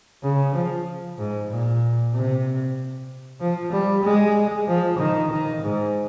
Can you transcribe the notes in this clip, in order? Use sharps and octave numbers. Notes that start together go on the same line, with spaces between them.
C#3
F3
G#2
A#2
C3
F3
G3
G#3
F3
D#3
D#3
G#2